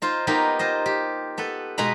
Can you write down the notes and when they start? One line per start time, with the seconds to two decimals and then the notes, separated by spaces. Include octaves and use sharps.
0.02 D#4 F4 C5
0.27 A#3 B3 D#4 F4 G4
0.59 F4 C5 D#5
0.86 G4
1.38 B3 A4 B4
1.78 B2 G#3 B4 A#5 B5